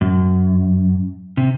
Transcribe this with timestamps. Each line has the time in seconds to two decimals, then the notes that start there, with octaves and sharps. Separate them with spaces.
0.01 F#2
1.37 C3